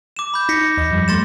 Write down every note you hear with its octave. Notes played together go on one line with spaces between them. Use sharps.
D6 E7
B5 G6
D#4 A#6 B6 C#7
E2 D#5
F#2 F3 G3
G3 A3 C6 A6 E7